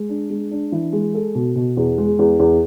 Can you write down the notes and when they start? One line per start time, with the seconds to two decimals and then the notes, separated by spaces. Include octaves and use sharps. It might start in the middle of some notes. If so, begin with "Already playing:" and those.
Already playing: G#3
0.09 D4
0.30 G#3
0.51 D4
0.72 E3
0.93 G#3
1.14 A4
1.35 B2
1.56 B2
1.77 E2
1.98 G#3
2.19 E2
2.39 E2